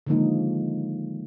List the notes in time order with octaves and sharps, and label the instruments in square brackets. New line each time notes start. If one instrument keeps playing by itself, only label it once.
[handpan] D3 D#3 F3 G#3 A#3 D#4